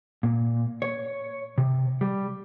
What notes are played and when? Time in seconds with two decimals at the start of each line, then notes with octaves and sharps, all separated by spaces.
0.23 A#2
0.82 C#5
1.58 C3
2.01 G3